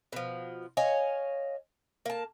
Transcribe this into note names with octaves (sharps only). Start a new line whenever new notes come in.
B2 F3
C#5 D#5 F5 G#5
A#3 A5